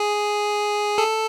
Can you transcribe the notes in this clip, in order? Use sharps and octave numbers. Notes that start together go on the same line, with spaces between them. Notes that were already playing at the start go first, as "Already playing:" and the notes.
Already playing: G#4
A4